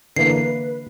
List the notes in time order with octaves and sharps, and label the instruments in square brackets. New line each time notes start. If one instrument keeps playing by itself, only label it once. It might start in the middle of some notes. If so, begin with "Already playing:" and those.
[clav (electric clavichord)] D3 E3 A#3 [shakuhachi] B4 [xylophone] C7